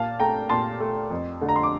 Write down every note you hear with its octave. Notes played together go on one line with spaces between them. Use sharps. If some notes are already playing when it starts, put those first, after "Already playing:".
Already playing: A#2 F5 A5
A3 G5 A#5
A#2 A5 C6
A3
F2
D3 A3
A#5
C6
D6